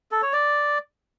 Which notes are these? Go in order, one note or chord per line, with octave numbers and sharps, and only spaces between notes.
A4
C#5
D5